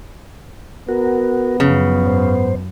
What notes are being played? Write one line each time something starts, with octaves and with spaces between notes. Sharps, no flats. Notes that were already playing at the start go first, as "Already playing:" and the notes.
B3 F#4 A#4
F#2 C#3 F3
G#2 C5